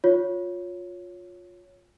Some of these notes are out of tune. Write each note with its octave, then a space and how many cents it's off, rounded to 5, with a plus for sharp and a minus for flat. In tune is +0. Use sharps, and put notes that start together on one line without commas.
F4 +20 C#5 +5